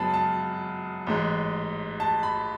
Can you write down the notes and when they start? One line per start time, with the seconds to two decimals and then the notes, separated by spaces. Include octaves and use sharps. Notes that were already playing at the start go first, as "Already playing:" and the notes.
Already playing: F#2 C#3 G#3 B3 A5 B5
0.14 A5
1.07 A1 G#2 G#3
2.00 A5
2.23 B5